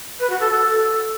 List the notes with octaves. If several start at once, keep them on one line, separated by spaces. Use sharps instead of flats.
B4
F#4
A4
A4